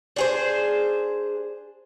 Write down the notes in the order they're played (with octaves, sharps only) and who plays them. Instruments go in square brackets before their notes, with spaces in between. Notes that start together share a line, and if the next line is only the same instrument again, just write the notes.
[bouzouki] D4 G#4 C5